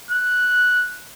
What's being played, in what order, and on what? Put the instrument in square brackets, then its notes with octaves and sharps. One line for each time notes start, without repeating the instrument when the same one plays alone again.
[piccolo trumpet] F#6